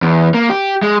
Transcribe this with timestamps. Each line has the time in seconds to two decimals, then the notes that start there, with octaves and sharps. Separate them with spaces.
0.02 E2
0.34 A#3
0.50 G4
0.82 G#3